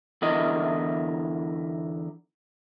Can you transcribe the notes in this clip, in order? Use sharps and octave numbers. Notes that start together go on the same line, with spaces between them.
E2 D3 E4 A#4 D#5